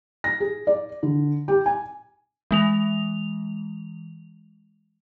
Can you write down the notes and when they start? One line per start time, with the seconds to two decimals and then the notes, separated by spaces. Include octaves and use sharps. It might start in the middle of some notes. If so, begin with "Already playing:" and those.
0.24 A#6
0.40 G#4
0.67 D5
1.03 D3
1.48 G4
1.66 G#5
2.51 E3 G#3 F7